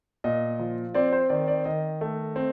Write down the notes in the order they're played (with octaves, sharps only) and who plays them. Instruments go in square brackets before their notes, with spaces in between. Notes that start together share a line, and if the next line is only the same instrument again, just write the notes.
[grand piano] A#2 D#5
F3
C4 D5
C5
D#3 D5
D5
D#3 D#5
A3
C4